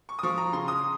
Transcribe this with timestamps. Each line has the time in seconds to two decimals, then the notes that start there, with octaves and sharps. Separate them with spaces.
0.09 C#6
0.19 D#6
0.23 F3 C#6
0.38 A#5
0.53 C#3 C6
0.68 D#6